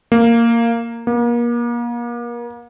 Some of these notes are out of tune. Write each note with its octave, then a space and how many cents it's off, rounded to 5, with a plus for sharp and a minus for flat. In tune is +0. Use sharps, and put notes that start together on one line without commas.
A#3 -10
A#3 +35